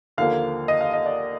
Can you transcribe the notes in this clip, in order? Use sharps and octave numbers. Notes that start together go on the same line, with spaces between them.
D#2 D3 F3 A#3 F5
D#5
F5
D#5
D5